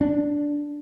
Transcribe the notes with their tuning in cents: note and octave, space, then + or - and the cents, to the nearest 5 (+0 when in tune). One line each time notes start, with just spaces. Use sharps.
D4 -5